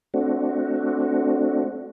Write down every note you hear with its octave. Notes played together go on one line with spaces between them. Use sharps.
A3 C4 D4 F#4